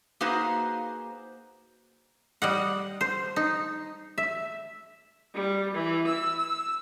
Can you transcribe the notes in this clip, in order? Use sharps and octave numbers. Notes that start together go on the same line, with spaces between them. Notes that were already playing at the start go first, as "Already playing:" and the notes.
A#3 D#4 F#4 G#4 B4 C5
G3 D#5 F#5
C5
D#4
E5
G3
E3
E6
E6